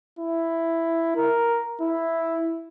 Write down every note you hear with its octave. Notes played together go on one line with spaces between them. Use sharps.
E4
A#4
E4